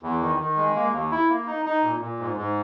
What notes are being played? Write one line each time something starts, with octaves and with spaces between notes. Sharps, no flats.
E2
D#3
D#3
G#3
A#3
D#2
E4
A#3
D#4
D#4
A#2
A#2
G#2
G#2